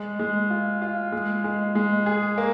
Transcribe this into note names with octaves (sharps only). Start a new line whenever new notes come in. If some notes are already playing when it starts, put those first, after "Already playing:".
Already playing: G#3
G#3
F4
F4
G#3
G#3
G#3
G#4
A#3